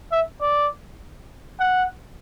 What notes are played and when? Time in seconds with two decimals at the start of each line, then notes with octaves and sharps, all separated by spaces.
0.12 E5
0.41 D5
1.60 F#5